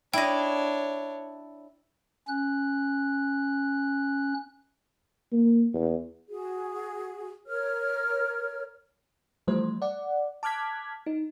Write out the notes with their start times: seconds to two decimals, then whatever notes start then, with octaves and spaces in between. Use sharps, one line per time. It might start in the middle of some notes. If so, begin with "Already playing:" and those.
0.14 D4 E4 C#5 D#5 G5
2.28 C#4 F#6
5.32 A#3
5.74 E2
6.29 F#4 G#4
7.46 A#4 C#5 F6
9.47 E3 F3 G3 A3 C5
9.82 D5 F#5
10.43 A5 D6 F6 F#6 G#6 B6
11.06 D#4